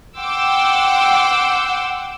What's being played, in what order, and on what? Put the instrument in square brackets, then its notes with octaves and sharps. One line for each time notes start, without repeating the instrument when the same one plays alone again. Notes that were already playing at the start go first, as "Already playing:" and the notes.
[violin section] F#5 G5 C6 D6 E6